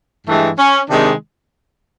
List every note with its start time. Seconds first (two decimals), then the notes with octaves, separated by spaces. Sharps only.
0.27 G2 E3 G#3 A3
0.58 C#4
0.89 C3 D#3 G#3 D4